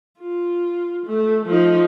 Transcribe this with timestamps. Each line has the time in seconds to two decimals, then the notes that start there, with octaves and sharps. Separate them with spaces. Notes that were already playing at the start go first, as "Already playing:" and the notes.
0.19 F4
1.06 A3
1.46 F3 D#4